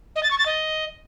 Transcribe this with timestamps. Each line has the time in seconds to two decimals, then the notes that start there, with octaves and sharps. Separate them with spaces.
0.16 D#5
0.23 A6
0.31 C#6
0.38 A6
0.46 D#5